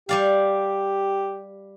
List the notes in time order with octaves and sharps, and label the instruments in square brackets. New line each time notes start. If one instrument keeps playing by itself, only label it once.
[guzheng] G3 D5 F5 [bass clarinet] G4